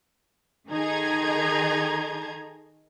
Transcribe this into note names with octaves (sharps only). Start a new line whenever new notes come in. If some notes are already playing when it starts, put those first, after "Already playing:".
D#3 D#4 G#4 A4 A#5 G#6